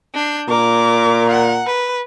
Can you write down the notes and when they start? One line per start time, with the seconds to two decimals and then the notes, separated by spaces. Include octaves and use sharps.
0.14 D4 G6
0.49 A#2 A#4 D6
1.30 F#5
1.66 B4